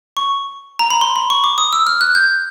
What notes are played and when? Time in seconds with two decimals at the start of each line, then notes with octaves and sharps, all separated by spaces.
0.17 C#6
0.79 A#5
0.90 B5
1.01 C6
1.16 B5
1.30 C#6
1.44 D6
1.58 D#6
1.73 E6
1.87 F6
2.01 F#6
2.15 G6